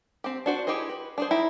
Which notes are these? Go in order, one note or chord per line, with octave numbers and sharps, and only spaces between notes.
C4 G4
D4 F#4 C5
E4 G4 G#4 C5 D#5
B4
D4 G#4 C5
D#4 E4 G5